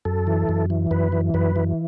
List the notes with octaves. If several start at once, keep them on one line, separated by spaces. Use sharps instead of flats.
F#2 A4
E3
F#2
E3
F#2 B4
E3
F#2 B4
E3